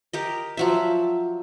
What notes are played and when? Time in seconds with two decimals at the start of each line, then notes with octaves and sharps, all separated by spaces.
0.13 G4 A#4 D#5
0.57 F3 F#3 E5